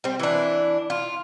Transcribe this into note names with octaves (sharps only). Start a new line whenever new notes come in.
G3 C4
E3 D4
F4